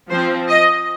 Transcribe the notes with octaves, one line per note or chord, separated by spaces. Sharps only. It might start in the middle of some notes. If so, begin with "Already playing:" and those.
F3 C4 C5
D#5